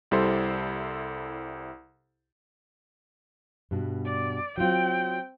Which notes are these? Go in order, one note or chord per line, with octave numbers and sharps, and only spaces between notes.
C2 G3 E4 A4 C5 C6
G2 B2
D5
F#3 C4 F4 G5